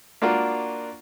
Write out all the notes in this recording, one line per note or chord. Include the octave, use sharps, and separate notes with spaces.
A#3 D4 F4 F#4 A#4